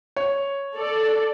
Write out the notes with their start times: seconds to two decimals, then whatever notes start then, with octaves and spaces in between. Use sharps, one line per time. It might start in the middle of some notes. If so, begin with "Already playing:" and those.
0.16 C#5
0.76 A4 D5